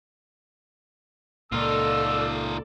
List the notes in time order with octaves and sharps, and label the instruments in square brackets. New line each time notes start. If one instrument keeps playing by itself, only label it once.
[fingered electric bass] C#2 A#2 A#3 [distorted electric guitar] D#4 F4 [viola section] A4 D5 [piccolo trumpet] E6